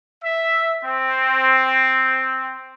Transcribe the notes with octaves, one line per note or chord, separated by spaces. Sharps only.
E5
C4